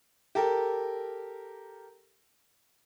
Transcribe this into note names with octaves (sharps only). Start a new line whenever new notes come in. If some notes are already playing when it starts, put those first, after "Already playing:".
G4 A4 A#4